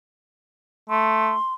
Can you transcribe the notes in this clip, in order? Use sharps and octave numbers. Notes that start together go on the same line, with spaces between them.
A3 C6